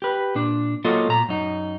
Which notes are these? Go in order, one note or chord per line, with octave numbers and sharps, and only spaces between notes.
G4 B4
A#2 D4
F#3 A#3 F4 A4 D#5
A#2 A#5
F#2 D#4